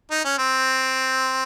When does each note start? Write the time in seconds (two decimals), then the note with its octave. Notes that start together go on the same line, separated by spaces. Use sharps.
0.11 D#4
0.25 C#4
0.38 C4